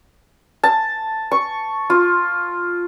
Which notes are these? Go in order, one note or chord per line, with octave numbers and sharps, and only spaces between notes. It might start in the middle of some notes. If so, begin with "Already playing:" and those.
A5
C#6
F4